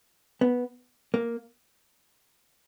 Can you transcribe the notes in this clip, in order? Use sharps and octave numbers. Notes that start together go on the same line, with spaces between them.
B3
A#3